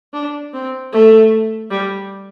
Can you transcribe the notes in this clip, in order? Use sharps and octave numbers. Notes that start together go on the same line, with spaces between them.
D4
C4
A3
G3